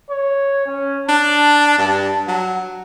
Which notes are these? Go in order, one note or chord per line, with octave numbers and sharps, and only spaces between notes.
C#5
C#4
D4 A5
G2
F#3